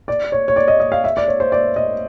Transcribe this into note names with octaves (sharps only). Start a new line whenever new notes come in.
D5
C#5
C#5
D5
D#5
D#5
F5
E5
D5
C#5
C5
D5
D#5